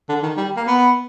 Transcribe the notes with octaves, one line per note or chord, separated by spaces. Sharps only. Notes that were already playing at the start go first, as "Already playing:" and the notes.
D3
D#3
G3
A#3
B3